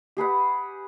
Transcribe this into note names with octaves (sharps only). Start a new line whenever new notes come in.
G4 G#4 B4 F#5